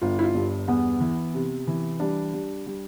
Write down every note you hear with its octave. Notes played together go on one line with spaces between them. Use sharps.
G1 F4
E4
F4
G2
E2 B3
E3
C3
E3
G3 D4
G3
G3